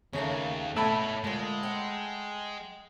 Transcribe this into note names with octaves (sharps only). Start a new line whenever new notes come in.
D#2 C#3 A3 A#3
B2 A3 E4 C#5 B5
D2 A#2 G#3
F#5 G5